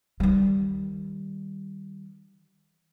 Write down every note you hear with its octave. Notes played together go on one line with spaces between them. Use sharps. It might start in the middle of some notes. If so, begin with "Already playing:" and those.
D#3 G3